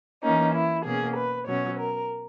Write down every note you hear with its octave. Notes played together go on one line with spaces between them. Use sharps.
E3 A#3 C#4 D#4
E4
B2 A#3 C#4 G#4
B4
B2 F#3 C#4 C#5
A#4